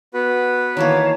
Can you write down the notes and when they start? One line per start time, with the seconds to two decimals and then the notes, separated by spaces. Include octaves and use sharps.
0.14 B3 F#4 B4
0.77 D#3 E3 A#3 C#5 F5 A5